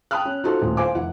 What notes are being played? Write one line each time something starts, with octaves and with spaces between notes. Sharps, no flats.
G5 A5 B5 D#6 F6 F#6
C#4
D#4 F4 F#4 A4 C5
D#1 A2 F4
C5 F5 G#5 D6
F1 E4 F#5